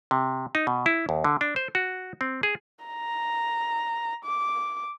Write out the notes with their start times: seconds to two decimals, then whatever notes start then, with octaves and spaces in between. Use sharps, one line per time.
0.11 C3
0.55 D#4
0.67 B2
0.86 E4
1.09 D#2
1.24 D3
1.41 D4
1.56 C5
1.75 F#4
2.21 C4
2.43 G#4
2.85 A#5
4.25 D6